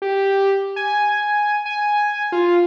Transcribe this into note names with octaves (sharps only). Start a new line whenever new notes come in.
G4
G#5
G#5
F4